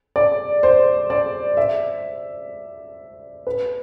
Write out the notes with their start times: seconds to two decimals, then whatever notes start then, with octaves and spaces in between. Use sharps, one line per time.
0.16 D5
0.63 C5
1.10 D5
1.57 E5
3.47 B4